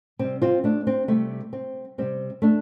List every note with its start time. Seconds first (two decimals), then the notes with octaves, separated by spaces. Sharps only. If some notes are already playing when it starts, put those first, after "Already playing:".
0.19 C3 G3 C4
0.42 C4 F4
0.64 A3 D4
0.87 C4
1.08 C3 G3 A3
1.53 C4
1.98 C3 G3 C4
2.42 A3 D4